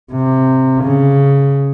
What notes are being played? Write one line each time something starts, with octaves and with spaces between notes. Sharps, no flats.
C3
C#3